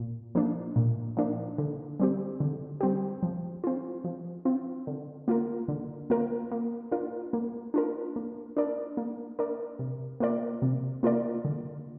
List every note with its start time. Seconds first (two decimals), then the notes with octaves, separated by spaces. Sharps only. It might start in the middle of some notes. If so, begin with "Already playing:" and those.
Already playing: A#2
0.35 F3 A#3 D4
0.76 A#2
1.17 F3 A#3 D4
1.58 D3
2.00 G3 C4 G4
2.40 D3
2.81 G3 C4 G4
3.23 F3
3.64 C4 F4
4.04 F3
4.45 C4 F4
4.87 D3
5.28 A#3 F4 A#4
5.68 D3
6.10 A#3 F4 A#4
6.51 A#3
6.91 D4 F4 A#4
7.33 A#3
7.74 D4 F4 A#4
8.16 A#3
8.57 D4 A#4 D5
8.97 A#3
9.39 D4 A#4 D5
9.79 C3
10.20 A#3 F4 A#4 D5
10.62 C3
11.03 A#3 F4 A#4 D5
11.45 D3